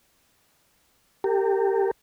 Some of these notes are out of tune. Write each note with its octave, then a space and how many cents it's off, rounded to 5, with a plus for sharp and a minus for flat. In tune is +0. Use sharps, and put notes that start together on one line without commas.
G4 +0 A#4 -40